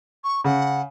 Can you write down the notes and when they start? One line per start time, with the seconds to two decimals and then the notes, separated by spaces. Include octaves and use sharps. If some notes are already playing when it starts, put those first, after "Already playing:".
0.24 C#6
0.44 C#3 F#5